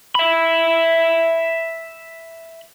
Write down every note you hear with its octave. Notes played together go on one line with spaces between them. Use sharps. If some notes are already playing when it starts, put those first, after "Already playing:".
E5 B5